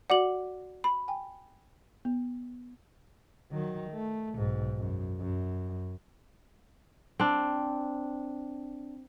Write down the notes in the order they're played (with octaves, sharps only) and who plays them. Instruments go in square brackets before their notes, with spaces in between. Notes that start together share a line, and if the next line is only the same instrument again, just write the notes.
[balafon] F#4 D5 [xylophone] F#5 D6 F#7
[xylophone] B5
[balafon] G5 G#5
B3
[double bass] D#3 F#3
A3
B1 G#2
F#2
F#2
[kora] C4 D4